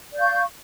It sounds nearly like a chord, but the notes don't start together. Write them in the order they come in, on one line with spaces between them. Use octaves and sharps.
D5 G6 F5 C#6